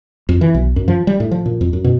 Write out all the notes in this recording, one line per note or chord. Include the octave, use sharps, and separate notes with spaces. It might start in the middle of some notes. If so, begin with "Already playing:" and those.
F2
E3
B1
F#2
F3
G3
A2
F3
A#2
F2
F#2
B2